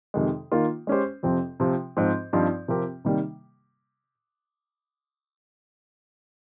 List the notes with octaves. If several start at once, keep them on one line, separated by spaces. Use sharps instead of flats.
F2 C3 D#3 G#3
D#3 A#3 F4
G#3 C#4 G4 C5
F2 C3 F3 C4
C3 F3 C4
G#2 F3 C4
G2 F3 C4 D#4
C3 F3 C4 G4 A#4
C3 D#3 G3 A#3